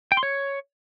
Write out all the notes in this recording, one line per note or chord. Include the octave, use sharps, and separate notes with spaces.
G5
C6
C#5